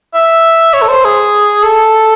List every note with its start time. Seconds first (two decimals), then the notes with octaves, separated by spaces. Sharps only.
0.14 E5
0.73 C#5
0.82 A4
0.88 C5
1.05 G#4
1.63 A4